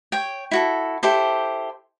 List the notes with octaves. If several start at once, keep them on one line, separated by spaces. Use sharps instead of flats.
C#5 G5
E4 F#4 A4
E4 G4 A4 C5